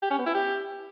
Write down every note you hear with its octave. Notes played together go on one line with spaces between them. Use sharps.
G4
C#4
B3
E4
G4